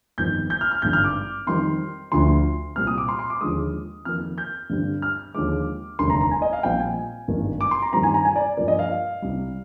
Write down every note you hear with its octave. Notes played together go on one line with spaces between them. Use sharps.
G1 F2 D#3 G3 C4 G6
G6
F6
F6
G#1 G2 D3 G6
F6
D6
F2 D#3 G3 C4 C6
D2 D3 F3 C6
C2 A#2 G3 C4 F6
D#6
D6
C6
C6
D6
D#2 D3 F3 G#3 D#6
F2 D#3 A#3 F6
G6
G2 D3 G3 C4
F6
D#2 D3 F3 G#3 D6
F1 D#2 D3 G3 A#3 C6
A#5
A#5
G#5
D#5
F5
A#1 A#2 G3 C4 G5
G#5
G#1 G2 D#3 A#3
D6
C6
A#5
G2 D#3 G3 C4 A#5
G#5
A#5
G#5
D5
G2 F3 A#3 D5
D#5
F5
C2 C3 G3